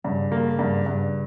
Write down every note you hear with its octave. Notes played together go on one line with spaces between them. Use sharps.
G2 C#3
A#3
G2
G2